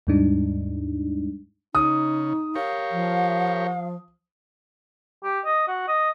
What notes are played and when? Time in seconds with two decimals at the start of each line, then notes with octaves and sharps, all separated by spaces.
0.07 D#2 G#2 G3 G#3 D4 D#4
1.75 C#3 D#4 D#6
2.56 G4 A#4 C#5 F5
2.91 F3
5.24 G4
5.45 D#5
5.68 F#4
5.88 D#5